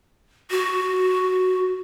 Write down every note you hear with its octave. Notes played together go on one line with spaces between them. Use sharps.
F#4